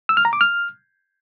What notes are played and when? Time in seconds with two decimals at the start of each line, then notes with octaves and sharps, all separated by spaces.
0.09 E6
0.17 F6
0.25 A#5
0.33 D6
0.41 F6